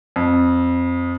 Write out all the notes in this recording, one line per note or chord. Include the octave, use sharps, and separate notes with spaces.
F2